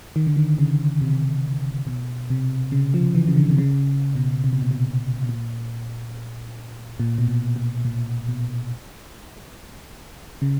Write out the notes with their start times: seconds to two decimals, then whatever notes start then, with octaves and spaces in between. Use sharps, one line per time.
0.16 D#3
0.27 D3
0.37 D#3
0.58 C#3
1.02 C3
1.87 B2
2.30 C3
2.72 C#3
2.94 F3
3.15 E3
3.28 C#3
3.36 D3
3.50 C3
3.58 C#3
4.15 B2
4.44 C3
4.53 B2
4.62 A#2
4.71 B2
5.23 B2
5.29 A#2
7.00 A#2
7.18 B2
7.28 A#2
7.56 A#2
7.85 A#2
8.28 B2
10.42 C#3